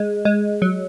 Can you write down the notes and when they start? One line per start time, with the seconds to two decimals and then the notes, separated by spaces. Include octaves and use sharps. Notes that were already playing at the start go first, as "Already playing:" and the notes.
Already playing: G#3
0.25 G#3
0.62 F#3